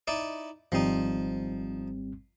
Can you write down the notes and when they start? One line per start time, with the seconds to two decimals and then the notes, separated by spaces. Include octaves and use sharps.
0.08 D#4 E4 D5
0.72 G#1 F3 G3 C4 D#4